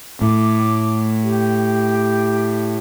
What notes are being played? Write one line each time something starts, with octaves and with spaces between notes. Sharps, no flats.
A2 D6
G4